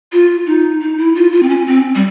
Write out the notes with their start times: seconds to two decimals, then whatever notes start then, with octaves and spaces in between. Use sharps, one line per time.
0.13 F4
0.46 D#4
0.81 D#4
0.98 E4
1.15 F4
1.32 F4
1.43 C4
1.49 C#4
1.67 C4
1.95 G3